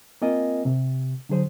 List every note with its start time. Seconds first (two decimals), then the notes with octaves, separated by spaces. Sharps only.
0.22 A#3 C4 F4 A#4 D#5 G#5
0.65 C3
1.29 D3 F#3 G#4 C5